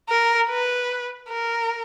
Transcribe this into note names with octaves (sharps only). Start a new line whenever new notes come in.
A#4
B4
A#4